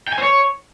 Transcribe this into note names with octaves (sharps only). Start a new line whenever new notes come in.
G5
G#5
C5
C#5